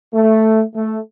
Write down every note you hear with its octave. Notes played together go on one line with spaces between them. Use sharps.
A3
A3